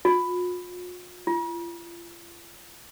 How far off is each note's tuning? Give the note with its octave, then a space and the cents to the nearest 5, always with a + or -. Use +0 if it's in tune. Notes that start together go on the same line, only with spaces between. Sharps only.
F4 +45
F4 -35